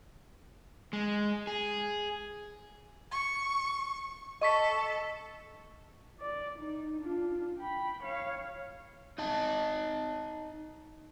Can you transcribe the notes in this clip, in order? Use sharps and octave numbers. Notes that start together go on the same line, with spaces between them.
G#3
G#4
C#6
A4 D#5 C#6 B6
D5
D#4
D4 F4
G5 B5
C#5 F5
D#4 D#5 A5